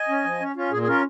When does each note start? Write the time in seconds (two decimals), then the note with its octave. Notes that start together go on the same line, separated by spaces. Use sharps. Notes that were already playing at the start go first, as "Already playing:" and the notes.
Already playing: D#5 G#5
0.09 C#4
0.24 F3
0.40 C#4
0.56 C#4 F4
0.71 A#2 G#4
0.82 G#4
0.87 C#4 F4 A#4